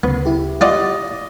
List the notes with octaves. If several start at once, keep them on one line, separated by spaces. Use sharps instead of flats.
D2 C#3 B3
E4 G4
F4 D5 D#5 F#5